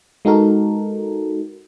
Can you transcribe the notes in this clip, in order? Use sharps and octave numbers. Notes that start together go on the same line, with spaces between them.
G#3 D#4 F#4 A4 A#4